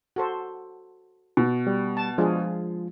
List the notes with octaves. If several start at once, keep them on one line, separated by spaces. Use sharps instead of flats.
F#4 A4 C5
B2
G3
A5
F3 G#3 D4 F4 G#4